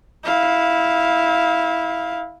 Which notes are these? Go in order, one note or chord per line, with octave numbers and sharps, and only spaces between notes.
E4 F5